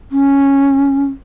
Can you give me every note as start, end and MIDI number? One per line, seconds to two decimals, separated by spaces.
0.12 1.05 61